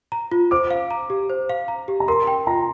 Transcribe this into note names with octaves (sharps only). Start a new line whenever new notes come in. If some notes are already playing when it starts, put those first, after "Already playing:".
A#5
F4
C5 D6
F5
A#5
G4
C5
F5
A#5
G4
A#5
A#4 C6
G5
F4 A#5